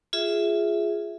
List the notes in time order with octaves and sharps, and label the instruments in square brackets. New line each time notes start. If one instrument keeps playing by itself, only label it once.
[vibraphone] F4 G#4 E5